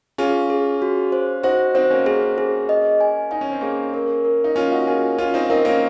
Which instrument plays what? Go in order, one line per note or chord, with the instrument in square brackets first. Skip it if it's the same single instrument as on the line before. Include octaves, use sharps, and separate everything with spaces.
[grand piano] C#4 F4 [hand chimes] G#4
[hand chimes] G#4
F#4
C5
[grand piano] D#4 F#4 [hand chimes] C5
[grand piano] C4 D#4 [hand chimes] C5
[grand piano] A#3 C#4
[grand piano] A#3 C#4 [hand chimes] G#4
[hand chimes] G#4
D#5
G#5
[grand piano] D#4 [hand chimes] G#5
[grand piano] C#4
C4
[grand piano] A#3 C#4 [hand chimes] G#4
[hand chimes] A#4
A#4
[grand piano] D#4
[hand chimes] A#3 [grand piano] C#4 F4
[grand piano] D#4 F#4
[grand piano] F4 G#4 [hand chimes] A#4
[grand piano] C#4 F4 [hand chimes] G#5
[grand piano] C4 D#4
[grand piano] C4 D#4 [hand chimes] A#4
[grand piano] A#3 C#4